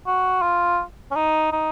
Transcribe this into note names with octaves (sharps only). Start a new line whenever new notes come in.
F#4
F4
C#4
D#4
D#4